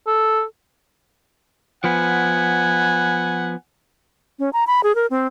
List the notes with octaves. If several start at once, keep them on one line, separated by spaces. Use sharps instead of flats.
A4
F3 B3 F#5 G#5
C#4
A#5
B5
G#4
A#4
C4